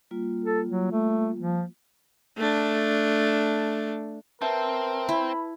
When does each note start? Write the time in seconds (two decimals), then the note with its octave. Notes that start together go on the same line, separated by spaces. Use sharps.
0.11 G3 A#3 F4
0.45 A4
0.69 F#3
0.92 A3
1.40 F3
2.37 A3 D4
4.42 C4 A#4 B4 E5 A5
5.09 E4 B5